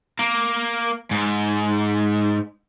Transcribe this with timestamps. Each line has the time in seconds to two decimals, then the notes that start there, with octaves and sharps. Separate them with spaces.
0.19 A#3
1.11 G#2